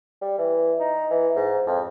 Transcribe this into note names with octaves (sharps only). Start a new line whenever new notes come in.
G3
E3
D#4
E3
G#2
F2